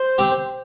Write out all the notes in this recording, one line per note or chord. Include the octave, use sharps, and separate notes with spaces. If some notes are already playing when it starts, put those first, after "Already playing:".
Already playing: C5
C4 G4